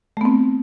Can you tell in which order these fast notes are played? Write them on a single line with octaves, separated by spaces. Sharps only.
A3 B3 C4